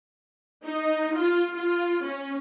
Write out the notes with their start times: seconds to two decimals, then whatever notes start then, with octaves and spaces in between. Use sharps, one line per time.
0.65 D#4
1.17 F4
1.54 F4
2.04 C#4